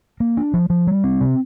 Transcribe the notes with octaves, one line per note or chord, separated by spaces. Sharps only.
A#3
D4
F3
F3
G3
C4
C3